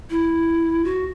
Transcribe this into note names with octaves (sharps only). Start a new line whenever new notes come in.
E4
F#4